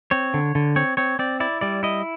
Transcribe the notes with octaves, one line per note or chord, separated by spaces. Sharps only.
C4 C#5
D3
D3
C4 C#5
C4 C#5
C4 D5
E4 D5
G3 D5
E4 D#5